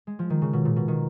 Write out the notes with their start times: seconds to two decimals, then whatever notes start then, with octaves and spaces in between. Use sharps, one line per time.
0.07 G#3
0.19 F3
0.30 D#3
0.42 C#3
0.53 B2
0.65 A#2
0.76 B2
0.88 D#3